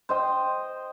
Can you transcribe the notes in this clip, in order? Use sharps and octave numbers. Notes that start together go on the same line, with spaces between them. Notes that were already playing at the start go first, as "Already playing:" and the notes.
C5 D#5 G5